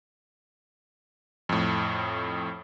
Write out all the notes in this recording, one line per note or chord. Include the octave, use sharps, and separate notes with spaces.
F2 A2